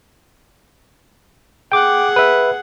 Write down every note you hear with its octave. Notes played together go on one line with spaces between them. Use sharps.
G#4 F#5 G5 D6
B4 E5